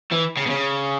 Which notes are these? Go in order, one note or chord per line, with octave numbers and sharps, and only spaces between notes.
E3
C#3
B2
C#3